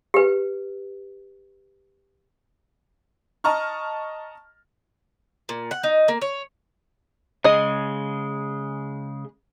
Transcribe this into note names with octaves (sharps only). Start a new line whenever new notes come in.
G4 B4
D#5 A5 A#5 C#6 F6
A#2
F#5
D#4
A#3
C#5
C#3 G#3 G#4 D#5